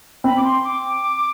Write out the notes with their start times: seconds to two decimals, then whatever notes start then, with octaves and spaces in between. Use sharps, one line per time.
0.24 C4 B5
0.37 D6
0.44 C6
0.64 D6